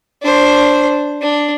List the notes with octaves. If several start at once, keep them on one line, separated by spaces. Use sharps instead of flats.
D4 C5
D4